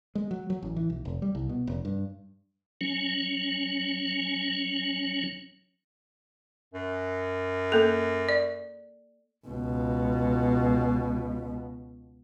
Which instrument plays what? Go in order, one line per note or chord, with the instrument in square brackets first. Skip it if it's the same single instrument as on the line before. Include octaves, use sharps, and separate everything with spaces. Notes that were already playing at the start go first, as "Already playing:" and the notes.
[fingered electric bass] G#3
F#3
F#3
A1
E3
B1
F1
G3
C2
B2
F1
G2
[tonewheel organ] F#3 C#4
[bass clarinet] F#2
[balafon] A#3 A4
D5
[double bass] C#2 B2